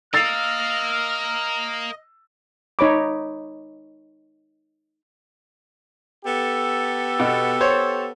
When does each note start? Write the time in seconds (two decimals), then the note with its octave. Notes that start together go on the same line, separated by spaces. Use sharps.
0.14 A#4 D#5 F5 E6 F6 A6 C7
2.79 D#4 C#5 B5 D6
6.25 B3 G4 A4
7.20 B2
7.61 C5 C#5